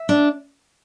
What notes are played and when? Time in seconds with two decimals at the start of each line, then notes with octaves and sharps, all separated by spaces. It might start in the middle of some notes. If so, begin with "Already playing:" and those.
Already playing: E5
0.09 D4